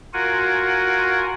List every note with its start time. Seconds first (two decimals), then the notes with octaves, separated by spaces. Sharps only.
0.14 F4 F#4 A#4 F#5 G#5